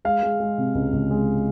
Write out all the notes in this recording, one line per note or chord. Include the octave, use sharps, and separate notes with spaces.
G#3 F5
G#3
G#3
C3
C#2
C#2
G#3